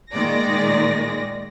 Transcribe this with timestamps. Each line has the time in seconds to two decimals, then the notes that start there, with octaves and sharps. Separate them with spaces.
0.14 A#2 D#3 G#3 D5 A#6